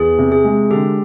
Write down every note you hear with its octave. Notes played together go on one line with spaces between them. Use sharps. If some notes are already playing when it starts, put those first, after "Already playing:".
Already playing: E2 G#4
C3
G#4
G#3
D3 G4 A4